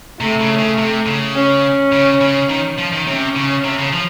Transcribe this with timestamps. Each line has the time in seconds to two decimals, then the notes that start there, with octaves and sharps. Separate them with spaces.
0.20 C3 A3
0.40 C#3
0.58 C#3
0.78 C3
1.06 C#3
1.35 C#4
1.92 C#3
2.21 C#3
2.49 D#3
2.78 F3
2.93 D#3
3.07 C3 C#4
3.36 C#3
3.64 C3
3.78 C#3
3.93 F3